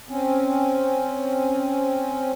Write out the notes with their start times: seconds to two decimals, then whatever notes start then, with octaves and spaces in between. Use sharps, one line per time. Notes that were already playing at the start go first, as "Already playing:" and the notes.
0.09 C4 C#4